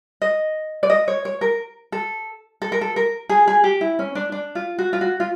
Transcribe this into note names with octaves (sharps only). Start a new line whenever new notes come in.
D#5
D5
D#5
C#5
C#5
A#4
A4
A4
A#4
A4
A#4
G#4
G#4
G4
E4
C#4
D4
D4
F4
F#4
F4
F#4
F4